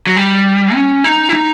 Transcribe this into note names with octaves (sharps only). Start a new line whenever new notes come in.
F#3
G3
C#4
D#4
E4
D#4